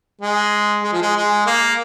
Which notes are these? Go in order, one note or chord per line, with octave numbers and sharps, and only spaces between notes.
G#3
G#3
F3
G#3
G#3
A#3